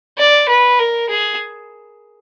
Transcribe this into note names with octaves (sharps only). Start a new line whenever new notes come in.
D5
B4
A#4
G#4